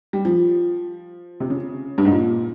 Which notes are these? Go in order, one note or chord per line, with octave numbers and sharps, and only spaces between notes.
G3
F3
C3
C#3
G2
G#2
A#2